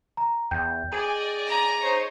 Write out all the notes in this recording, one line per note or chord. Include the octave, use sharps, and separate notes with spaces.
A#5
E2 G5 G6
G#4 D5 D#5 G#5
A#5
D#4 C5 C#5